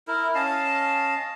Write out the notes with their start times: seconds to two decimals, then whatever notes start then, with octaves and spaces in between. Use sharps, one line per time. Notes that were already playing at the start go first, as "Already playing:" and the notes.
0.08 E4 A#4
0.35 C#4 D#5 F5 A5